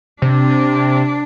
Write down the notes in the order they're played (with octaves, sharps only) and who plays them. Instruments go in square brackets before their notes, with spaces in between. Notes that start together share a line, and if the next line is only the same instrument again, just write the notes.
[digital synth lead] C3 [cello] D4